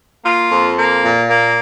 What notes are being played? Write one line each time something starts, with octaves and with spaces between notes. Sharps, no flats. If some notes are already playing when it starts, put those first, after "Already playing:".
A#3 F4
F2
A#3
A#2
A#3